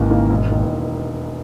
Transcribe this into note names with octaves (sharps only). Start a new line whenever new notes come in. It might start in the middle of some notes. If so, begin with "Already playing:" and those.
Already playing: G#1 D#2 G#2 C#3 E3 A#3 D#4
C#3 E3 A#3 D#4
E1
E2 D#3 A#3